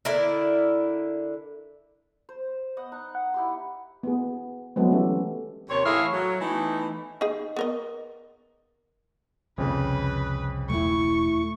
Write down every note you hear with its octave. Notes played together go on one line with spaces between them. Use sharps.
D3 E4 A#4 D5
C5
B3 D#5 F#5
D#4 F#6
F#5
E4 G4 C6
B3 G#4
F#3 G#3 A3 B3 C4
E3 C#4 G4 A4
D#2 C3 C4 C#5
A2 E3 G#4 C#5 E5 F5
F#3
E3 A3 B3 D#4
D#4 G#4
B3 A#4 D#5
C2 F2 C#3 B4
E1 A3 E4 C#6